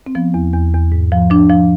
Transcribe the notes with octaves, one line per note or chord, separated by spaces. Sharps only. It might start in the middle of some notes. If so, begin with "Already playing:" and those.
C4
F3 B3
E2
E2
E2
G#2
F3
F3 D4
F3